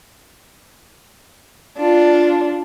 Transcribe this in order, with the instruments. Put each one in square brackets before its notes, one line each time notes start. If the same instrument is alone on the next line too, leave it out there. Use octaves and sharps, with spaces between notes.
[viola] D4 F4